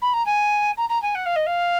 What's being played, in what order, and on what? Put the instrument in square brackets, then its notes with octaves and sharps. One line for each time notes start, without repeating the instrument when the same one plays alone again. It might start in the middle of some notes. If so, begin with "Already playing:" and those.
[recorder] B5
A#5
G#5
A#5
A#5
G#5
F#5
F5
D#5
F5